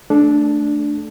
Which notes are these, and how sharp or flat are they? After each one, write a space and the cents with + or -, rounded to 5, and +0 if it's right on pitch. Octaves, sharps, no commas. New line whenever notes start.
A3 +0 D4 +0 A4 -35